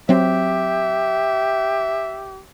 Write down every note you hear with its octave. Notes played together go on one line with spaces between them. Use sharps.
F#3 C4 G4 E5